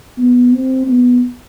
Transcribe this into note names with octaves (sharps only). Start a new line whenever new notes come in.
B3
C4
B3